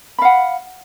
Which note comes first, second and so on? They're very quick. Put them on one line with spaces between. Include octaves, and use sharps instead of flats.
B5 F5 F#5